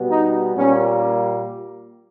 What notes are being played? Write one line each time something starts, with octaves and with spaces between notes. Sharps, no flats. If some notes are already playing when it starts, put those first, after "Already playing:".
Already playing: B2 G3 B3
D#4
A#2 G3 A#3 C#4